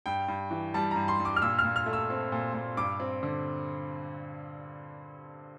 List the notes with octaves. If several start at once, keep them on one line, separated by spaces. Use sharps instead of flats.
G2 G5
G2
E3
G3 A5
G2 A#5
C6
G2
D6
F6
A#2 E6
F6
A#2
F6
A3
E6
C4
A#2
A#2
G2 D6
C4
D3